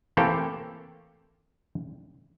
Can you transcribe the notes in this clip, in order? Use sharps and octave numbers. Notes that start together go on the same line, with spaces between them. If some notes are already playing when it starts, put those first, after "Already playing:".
E3 A3 A#3 C4 G4 A4